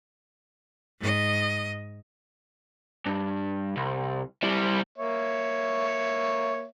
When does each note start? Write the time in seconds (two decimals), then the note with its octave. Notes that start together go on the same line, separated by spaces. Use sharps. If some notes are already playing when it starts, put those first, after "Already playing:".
1.00 G#2 D#5
3.06 G2
3.77 C2
4.43 G3 E4
4.98 A#3 C#5 E5